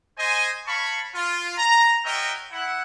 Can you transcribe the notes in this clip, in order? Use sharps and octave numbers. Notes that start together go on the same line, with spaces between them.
C5 D#5 G#5
C#5 F5 A5 B5 C#6
F4
A#5
F#4 A#4 C#5 D#5 E5 G5
E4 F#5